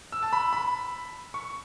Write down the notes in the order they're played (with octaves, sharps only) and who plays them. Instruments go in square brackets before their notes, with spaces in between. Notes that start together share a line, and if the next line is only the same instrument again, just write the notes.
[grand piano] E6
A5
B5
B5
C#6